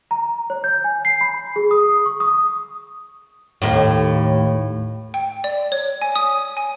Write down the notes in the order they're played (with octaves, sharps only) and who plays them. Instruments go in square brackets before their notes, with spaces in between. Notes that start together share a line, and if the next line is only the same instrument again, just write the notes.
[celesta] A#5
C#5
G6
G#5
C7
B5
G#4
D#6
C#6
D#6
[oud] D#2 A2
[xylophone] G5
D5
C#5
G#5
D#6
G#5